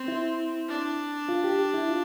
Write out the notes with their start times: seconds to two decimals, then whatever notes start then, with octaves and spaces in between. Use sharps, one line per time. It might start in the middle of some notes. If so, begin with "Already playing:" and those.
Already playing: C4
0.08 E4
0.69 D4
1.29 F4
1.44 G4
1.59 G4
1.74 E4
1.89 F4